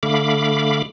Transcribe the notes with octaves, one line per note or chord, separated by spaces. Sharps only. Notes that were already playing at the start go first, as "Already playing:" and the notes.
D3 A3 F5 B5 D6